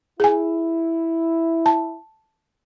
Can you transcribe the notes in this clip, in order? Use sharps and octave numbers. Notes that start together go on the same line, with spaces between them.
E4 G#4 G#5
A5